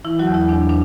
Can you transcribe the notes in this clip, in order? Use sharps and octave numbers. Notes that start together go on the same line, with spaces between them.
E3 E4
F#3 F#4
E2
E4
E2 D4
D4